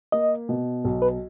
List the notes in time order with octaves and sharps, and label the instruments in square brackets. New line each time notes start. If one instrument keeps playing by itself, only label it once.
[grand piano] A#3 [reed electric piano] D#5
[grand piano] B2
B1
[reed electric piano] B4